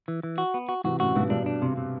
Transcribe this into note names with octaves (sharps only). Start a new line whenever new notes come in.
E3
E3
F#4
B3
F#4
C3 E3 F#4
F#2 A2 F#4
G2 B2 E3
G2 B2 D4
D4
C3
C3